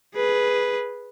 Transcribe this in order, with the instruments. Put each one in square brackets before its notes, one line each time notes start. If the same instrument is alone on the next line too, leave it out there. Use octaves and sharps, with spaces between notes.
[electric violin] G#4 B4